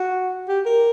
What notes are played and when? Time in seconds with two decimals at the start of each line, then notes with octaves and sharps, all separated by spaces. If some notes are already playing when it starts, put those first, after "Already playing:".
Already playing: F#4
0.48 G4
0.66 A#4